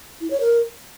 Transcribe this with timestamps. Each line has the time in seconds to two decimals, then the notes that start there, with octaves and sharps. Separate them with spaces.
0.21 E4
0.31 C#5
0.40 A#4